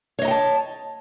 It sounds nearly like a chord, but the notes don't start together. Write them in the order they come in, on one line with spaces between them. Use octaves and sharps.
C#5 D#5 A#5 G5 A5